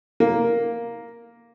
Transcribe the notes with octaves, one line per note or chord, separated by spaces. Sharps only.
A#3